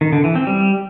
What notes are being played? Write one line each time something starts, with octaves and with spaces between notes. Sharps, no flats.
D#3
D3
E3
C4
G3